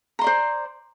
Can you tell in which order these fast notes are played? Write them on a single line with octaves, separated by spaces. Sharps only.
A#5 C6 D5 C5